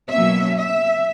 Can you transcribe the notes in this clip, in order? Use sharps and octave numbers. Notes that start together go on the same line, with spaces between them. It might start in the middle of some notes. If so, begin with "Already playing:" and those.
B2 F#3 A#3 C#4 E5
E5